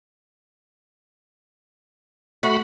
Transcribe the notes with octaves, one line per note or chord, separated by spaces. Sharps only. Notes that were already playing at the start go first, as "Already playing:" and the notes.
A3 F#4 F#5 B5